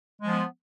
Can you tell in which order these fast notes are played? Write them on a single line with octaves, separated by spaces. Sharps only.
G#3 F3 B3